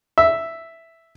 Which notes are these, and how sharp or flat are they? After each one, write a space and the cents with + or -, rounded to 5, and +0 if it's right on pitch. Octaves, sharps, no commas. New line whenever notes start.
E5 +0